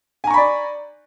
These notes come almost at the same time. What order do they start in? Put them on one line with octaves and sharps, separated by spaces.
G#5 A#5 C#6 B5 D5